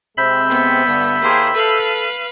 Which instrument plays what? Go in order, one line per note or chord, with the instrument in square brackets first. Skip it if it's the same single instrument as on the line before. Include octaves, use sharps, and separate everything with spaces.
[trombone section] C3 G#3 C4 [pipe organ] E5 B5 G6
[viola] B3
[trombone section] G2 D3
[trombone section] D#2 A#3 G4 [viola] G#4 C5
[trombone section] A4 [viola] B4 F5